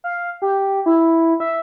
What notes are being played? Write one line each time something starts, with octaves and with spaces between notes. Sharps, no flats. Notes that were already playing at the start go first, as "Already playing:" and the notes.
F5
G4
E4
E5